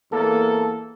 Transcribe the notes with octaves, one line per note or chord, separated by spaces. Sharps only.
E2 A#3 A4